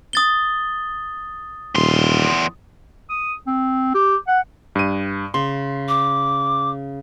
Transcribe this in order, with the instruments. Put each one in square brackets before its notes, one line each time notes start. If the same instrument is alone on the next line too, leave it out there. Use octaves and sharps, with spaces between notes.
[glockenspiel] D#6 A6 G7
[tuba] D#1 [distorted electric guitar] E2 C6
[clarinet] D#6
C4
G4
F#5
[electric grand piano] G2 D#7
[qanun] C#3 [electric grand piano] C6
[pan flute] D6